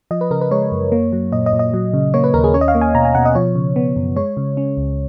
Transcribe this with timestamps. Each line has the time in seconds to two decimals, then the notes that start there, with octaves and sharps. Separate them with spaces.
0.11 F3 D#5
0.21 B4
0.31 C#3 A#4
0.41 B4
0.51 G#3 C#5
0.72 F#2
0.92 A#3
1.13 F#3
1.32 A#2 D#5
1.46 D#5
1.53 A#2
1.59 D#5
1.74 F#3
1.94 C#3
2.14 A#3 C#5
2.24 B4
2.34 D#2 A#4
2.44 G#4
2.54 C#4 C#5
2.61 D#5
2.68 F5
2.75 A#3
2.81 G#5
2.95 B2 A#5
3.05 G#5
3.15 B2 F#5
3.25 D#5
3.35 F3 C#5
3.55 C#3
3.76 B3
3.96 F#2
4.16 G#3 C#5
4.37 C#3
4.57 C#4
4.77 C#2